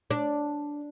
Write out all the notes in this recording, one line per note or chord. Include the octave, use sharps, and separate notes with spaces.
D4